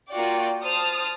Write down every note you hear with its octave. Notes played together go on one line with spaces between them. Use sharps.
A#3 F4 F#4 D5 G5
C5 A5 D#6 F6